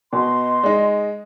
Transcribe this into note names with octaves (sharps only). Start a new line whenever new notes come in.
B2 D#5 C6
G#3 D#4